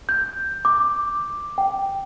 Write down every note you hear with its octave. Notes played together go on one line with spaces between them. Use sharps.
G6
D6
G5